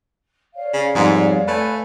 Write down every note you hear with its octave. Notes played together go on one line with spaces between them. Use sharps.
C#5 D5 F5
C#3
F2 G#2 G3 B3
A3 B4 G#5